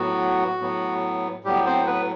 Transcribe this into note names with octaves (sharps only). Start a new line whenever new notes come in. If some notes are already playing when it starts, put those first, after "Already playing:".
Already playing: A2 F#3 B3 F#4
A2 F#3 B3
A2 F#3 G3 B3 G4
C4 C5
B3 B4